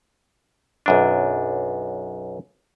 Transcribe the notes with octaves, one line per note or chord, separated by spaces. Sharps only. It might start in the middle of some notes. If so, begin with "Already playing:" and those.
B1 F#2 D4